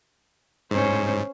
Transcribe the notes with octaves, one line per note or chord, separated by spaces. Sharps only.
G#2 C#4 C5